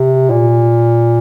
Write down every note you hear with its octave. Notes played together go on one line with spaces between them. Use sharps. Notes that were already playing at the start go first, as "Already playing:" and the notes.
Already playing: C3
A#2